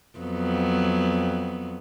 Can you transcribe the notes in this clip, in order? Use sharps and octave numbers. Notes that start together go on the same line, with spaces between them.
F2 F#3 B3